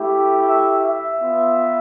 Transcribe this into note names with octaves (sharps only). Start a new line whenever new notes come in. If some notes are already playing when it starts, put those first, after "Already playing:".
Already playing: A3 E4 G4
E5
E5
B3 F4